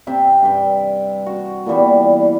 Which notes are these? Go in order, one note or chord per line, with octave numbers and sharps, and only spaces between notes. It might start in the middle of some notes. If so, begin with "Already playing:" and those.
C3 E5 G5
G2 G5
F#4
A#2 E3 G3 B3